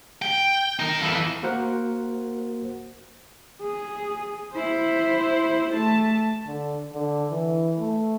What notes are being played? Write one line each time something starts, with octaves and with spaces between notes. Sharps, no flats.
G5
D#4 A#4
F2 E3
A#3 F#4 A#4 C5 F#5
G#4
E4 C5
A3 A5
D3
D3
E3
A3